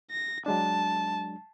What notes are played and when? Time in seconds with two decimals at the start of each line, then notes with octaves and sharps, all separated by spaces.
0.11 A#6
0.46 F#3 G#3 D4 A5